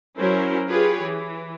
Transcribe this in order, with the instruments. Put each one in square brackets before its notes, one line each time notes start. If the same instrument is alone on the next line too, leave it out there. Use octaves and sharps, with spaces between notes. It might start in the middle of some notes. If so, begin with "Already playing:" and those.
[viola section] F#3 C#4 E4 A#4 C5
F4 G4 G#4 B4 C#5
E3